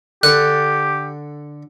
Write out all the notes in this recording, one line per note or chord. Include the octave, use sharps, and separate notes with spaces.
D3 G4 A4 F#6